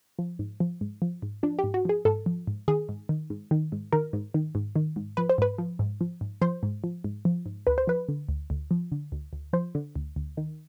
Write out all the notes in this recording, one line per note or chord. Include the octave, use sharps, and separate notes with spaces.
F3
G#2
F3
G#2
F3
G#2
F3 D4
G4
G#2
F#4
F3 G#4
G#2 A4
F3
G#2
D#3 G#4
G#2
D#3
G#2
D#3
G#2
D#3 A#4
G#2
D#3
G#2
D#3
G#2
F3 B4
C5
G#2 B4
F3
G#2
F3
G#2
F3 C5
G#2
F3
G#2
F3
G#2
D2 B4
C5
F3 B4
D3
D2
D2
F3
D3
D2
D2
F3 C5
D3
D2
D2
D#3